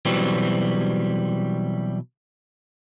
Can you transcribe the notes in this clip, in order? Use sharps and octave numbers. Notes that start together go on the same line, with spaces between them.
B2 E3 F#3 G3 C4